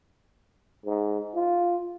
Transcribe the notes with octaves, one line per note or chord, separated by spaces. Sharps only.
G#2
F4